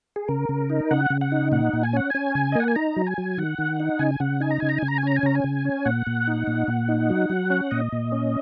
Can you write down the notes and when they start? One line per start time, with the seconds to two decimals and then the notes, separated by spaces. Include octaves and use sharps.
0.16 G#4
0.28 C#3 A#4
0.49 C#3
0.70 D#4
0.91 C#3 F#5
1.10 C#3
1.21 F#5
1.32 D#4
1.52 A#2 F#5
1.73 A#2
1.83 G#5
1.93 C#4 F#5
2.10 C#4 G#5
2.35 C#3
2.52 D#5
2.55 A#3 F#5
2.68 G#5
2.76 D#4 A#5
2.96 F#3
3.06 G#5
3.18 F#3
3.38 D#3 F#5
3.58 D#3
3.80 D#4
3.99 C#3 G#5
4.20 C#3 F#5
4.40 D#4 G#5
4.50 A#5
4.60 C#3 G#5
4.69 A#5
4.78 C#3 G#5
4.88 A#5
4.98 G#5
5.03 C#4 A#5
5.16 G#5
5.23 C#3 A#5
5.35 G#5
5.44 C#3
5.65 C#4
5.85 A#2 F#5
6.07 A#2
6.27 D#4
6.47 A#2
6.68 A#2
6.88 D#4
7.10 F#3
7.30 F#3
7.50 C#4
7.71 A#2 D#5
7.92 A#2
8.12 C#4